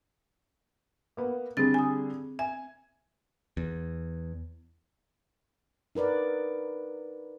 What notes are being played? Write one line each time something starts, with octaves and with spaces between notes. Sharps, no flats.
A#3 B3
D3 G3 C4 G#4 A6
G#5 D#6
E5 G#5
E2
D#4 A#4 B4 D5